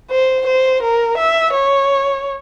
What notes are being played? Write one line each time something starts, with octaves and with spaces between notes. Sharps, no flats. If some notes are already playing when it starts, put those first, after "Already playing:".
C5
C5
A#4
E5
C#5